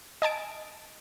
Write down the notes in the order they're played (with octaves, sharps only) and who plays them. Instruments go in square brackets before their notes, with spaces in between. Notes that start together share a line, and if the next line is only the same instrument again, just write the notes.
[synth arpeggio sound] D#5 G#5 A5 D7